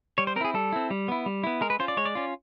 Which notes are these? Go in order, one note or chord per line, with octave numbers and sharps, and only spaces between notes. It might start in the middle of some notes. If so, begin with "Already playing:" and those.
G3 C#5
C5
C4 E4 G#4 A#4
G3 A4
C4 E4
G3
B3 E4
G3
B3 E4
G#3 A#4
B4
C#4 F4 C5
D5
G#3 C#5
D5
C#4 F4